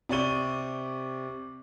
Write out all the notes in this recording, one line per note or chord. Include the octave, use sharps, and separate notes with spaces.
C3 G4 D5 C#6 D#7 G7